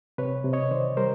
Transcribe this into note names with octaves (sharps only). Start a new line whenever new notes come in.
C3 B4 C#5
C3
C#5 D#5
D#3 C5 D5
G3 A#4 C5